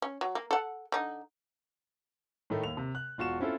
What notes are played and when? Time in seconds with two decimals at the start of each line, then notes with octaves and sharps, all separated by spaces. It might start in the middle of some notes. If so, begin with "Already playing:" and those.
0.02 C#4
0.21 F#3
0.35 A#3
0.51 A4 F#5
0.92 D3 D#4
2.50 A2 D#3 A3
2.64 D#2 F7
2.77 C3
2.95 F#6
3.18 E1 F4 F#4 C#6 E7
3.40 C4 C#4 E4 F4 A4